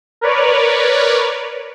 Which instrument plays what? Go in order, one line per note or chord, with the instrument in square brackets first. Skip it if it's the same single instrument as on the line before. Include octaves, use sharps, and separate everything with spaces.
[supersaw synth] A#4 B4 C#5 D5